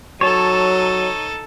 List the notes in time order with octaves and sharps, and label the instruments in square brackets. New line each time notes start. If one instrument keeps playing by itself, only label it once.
[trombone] F#3 [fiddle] D#4 A4 [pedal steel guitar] C#5 A5